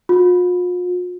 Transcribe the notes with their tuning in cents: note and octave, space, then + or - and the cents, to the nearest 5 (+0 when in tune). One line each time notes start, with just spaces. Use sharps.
F4 +40